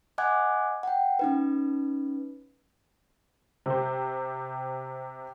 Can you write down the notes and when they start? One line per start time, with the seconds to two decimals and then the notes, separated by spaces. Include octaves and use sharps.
0.18 D#5 F#5 G#5 D6 F#6 G#6
0.83 F#5 G5
1.19 C#4 D#4 B4
3.66 C3 G4 C5